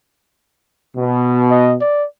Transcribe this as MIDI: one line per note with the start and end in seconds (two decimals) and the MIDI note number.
0.96 1.76 47
1.51 1.74 75
1.81 2.06 74